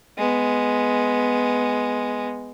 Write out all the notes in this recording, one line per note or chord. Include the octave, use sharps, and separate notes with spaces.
G#3 B3